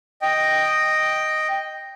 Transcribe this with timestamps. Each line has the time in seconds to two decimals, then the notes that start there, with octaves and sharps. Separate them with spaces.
0.22 D#5 G5